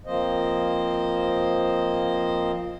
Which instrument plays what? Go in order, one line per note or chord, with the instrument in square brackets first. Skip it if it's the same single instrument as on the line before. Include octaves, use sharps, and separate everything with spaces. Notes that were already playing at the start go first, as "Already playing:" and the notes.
[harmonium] F3 A#3 C4 C5 D#5